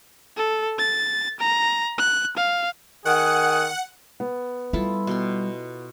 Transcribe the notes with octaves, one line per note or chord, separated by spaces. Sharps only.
A4
A6
A#5
F#6
F5
D#3 G#4 F#5 F#6
B3
G3 E4 F4 A4
B2 G5 C6